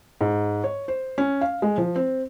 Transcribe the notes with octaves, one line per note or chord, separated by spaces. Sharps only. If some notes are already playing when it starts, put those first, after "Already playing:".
G#2
C#5
C5
C#4
F5
G#3
F3
C4